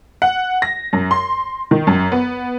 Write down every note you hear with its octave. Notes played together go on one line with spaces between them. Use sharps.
F#5
A#6
F#2
C6
D#3
F#2
B3